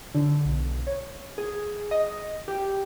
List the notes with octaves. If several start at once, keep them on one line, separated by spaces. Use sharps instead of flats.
D3
B1
C#5
G#4
D#5
G4